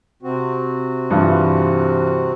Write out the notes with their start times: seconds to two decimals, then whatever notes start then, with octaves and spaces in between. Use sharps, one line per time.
0.23 C3 C4 F#4
1.10 G2 E3 F4